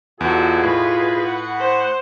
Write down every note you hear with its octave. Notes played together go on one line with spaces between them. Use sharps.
E2 B2 F4 F#4 G#4 A4
A2 B4
F#5
C5